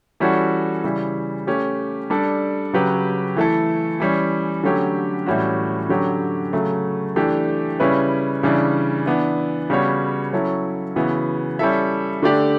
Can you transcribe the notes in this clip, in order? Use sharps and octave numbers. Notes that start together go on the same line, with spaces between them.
E3 G3 C#4 F#4 A4
C#3 E3 G3
A3 C#4 G4
G3 D4 A4
C#3 F#3 C#4 G4 B4
E3 A3 E4 A4
E3 G3 C#4
D3 F#3 A3 C#4 G4
A2 E3 G3 C#4 F#4
D3 F#3 C#4 G4
C#3 F#3 A3
E3 A3 D4 G4
C#3 G3 C#4 E4 B4
C#3 E3 G3 D4
E3 B3 D4
C#3 G3 B3 F#4 C#5
F#3 C#4 E4 A4
C#3 E3 B3 F#4
G3 C#4 E4 A4 E5
D3 A3 D4 G4 D5